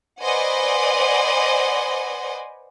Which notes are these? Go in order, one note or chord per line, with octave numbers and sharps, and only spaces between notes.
B4 C5 D5 D#5 F#5 G#5